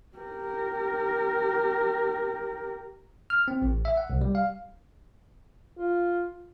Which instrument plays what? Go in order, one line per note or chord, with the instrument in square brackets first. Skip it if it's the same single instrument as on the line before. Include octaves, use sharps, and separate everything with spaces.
[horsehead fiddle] G4 A#4
[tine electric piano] F6
C4
A1
E5
F#5
C2
G3
F5
[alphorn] F4